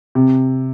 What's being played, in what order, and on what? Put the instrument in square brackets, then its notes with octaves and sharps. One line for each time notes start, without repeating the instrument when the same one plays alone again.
[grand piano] C3